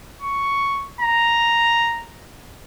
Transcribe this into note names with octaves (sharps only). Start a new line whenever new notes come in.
C#6
A#5